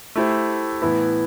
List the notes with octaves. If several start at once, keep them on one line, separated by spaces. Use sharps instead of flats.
A3 E4 G4 C5
A2 E3 B3 E4